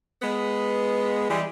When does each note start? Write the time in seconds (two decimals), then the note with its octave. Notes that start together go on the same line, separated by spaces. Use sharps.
0.23 G#3 B3
1.30 E3 G3 G#3